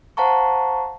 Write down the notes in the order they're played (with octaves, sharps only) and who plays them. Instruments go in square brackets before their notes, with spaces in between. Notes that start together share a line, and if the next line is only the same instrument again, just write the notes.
[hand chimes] C5 F5 F#5 A5 A#5 C#6